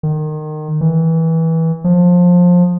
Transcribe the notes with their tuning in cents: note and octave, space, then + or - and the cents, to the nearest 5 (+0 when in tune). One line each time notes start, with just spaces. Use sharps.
D#3 -25
E3 -20
F3 +20